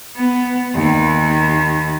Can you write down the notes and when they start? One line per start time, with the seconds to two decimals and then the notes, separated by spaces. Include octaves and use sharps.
0.16 B3
0.75 D#2